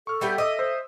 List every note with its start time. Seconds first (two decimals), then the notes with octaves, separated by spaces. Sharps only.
0.07 A4 C#6 F6
0.21 G3 B3 E5 G5
0.38 D#5 D6 E6
0.59 C5